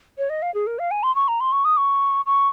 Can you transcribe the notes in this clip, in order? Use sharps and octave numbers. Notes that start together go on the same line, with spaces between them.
C#5
D#5
F5
G#4
A#4
F5
G#5
C6
C#6
A#5
C6
C#6
D#6
C#6
C#6